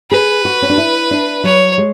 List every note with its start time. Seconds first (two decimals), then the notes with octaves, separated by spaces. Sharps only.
0.11 G#4 B4
0.45 F#4
0.62 C#4
0.69 D4
0.78 E4
1.11 D4
1.44 F#3 C#5
1.78 G#3